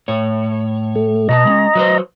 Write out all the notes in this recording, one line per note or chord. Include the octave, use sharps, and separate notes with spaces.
A2 C#5
A3
B2 A4 D#5 A5 A#5
G#3 B3 C#4
F#3 B4 C5